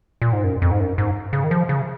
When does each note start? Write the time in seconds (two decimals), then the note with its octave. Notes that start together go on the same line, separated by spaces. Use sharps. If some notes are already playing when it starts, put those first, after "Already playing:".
0.22 A#2
0.33 G#2
0.44 F#2
0.62 F2
0.71 G#2
0.80 F#2
0.98 G#2
1.33 C#3
1.44 D#3
1.51 F3
1.69 C#3